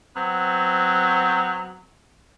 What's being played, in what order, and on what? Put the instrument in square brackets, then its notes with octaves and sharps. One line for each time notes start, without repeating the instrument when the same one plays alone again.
[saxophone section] F#3 B3 C4